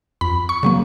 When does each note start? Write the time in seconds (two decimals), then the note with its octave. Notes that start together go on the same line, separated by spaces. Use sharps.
0.21 F2 B5
0.49 C#6
0.63 C#3 F#3 A#3